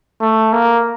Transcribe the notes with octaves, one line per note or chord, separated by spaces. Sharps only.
A3
A#3